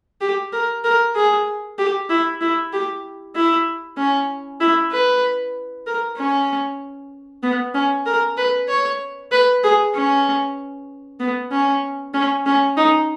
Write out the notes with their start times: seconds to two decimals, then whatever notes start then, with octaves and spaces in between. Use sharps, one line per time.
0.21 G4
0.53 A#4
0.84 A#4
1.15 G#4
1.78 G4
2.09 E4
2.41 E4
2.73 G4
3.35 E4
3.97 C#4
4.60 E4
4.92 B4
5.87 A#4
6.17 C#4
7.43 B3
7.74 C#4
8.06 A#4
8.37 B4
8.68 C#5
9.32 B4
9.63 G#4
9.94 C#4
11.20 B3
11.52 C#4
12.14 C#4
12.46 C#4
12.77 D#4